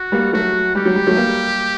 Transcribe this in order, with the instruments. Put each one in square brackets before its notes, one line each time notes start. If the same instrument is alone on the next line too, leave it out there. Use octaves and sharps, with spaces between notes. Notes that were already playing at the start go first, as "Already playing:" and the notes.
Already playing: [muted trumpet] F#4
[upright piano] G3 A#3
[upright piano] F#3 A3 [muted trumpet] F#4
[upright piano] G3 [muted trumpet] G4
[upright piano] F#3
G3
F#3 A3
G3 A#3